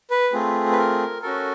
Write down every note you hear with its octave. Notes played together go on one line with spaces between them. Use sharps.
B4
A3 C4 F4 G#4
B4
A#4
C#4 F#4 A4 A#4